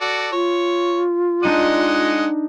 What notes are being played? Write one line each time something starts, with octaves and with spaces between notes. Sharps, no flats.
F#4 A4 D5
F4 C#5
G#3 D4 D#4 D#5 F#5 D#7